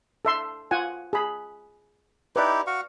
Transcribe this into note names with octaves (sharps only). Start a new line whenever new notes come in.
A4 E5 C6
F4 F#5 G#5
G#4 B5
D#4 E4 G4 B4 D5
F#4 F5 C#6